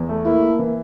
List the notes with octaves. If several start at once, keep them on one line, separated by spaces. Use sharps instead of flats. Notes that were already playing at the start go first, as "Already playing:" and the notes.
Already playing: E2
A3
A#3 E4
A#3
E3